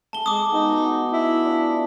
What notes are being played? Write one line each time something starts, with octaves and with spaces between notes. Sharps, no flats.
A3 G#4 A5 G7
G#3 D6 D#6
B3 D#4 F#4
E4
D4 F4